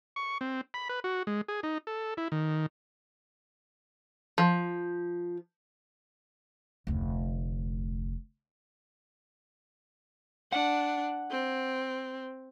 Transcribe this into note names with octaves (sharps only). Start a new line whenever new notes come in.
C#6
C4
B5
B4
F#4
G#3
G#4
D#4
A4
E4
D#3
F3
F1 D2
D4 F#5
C4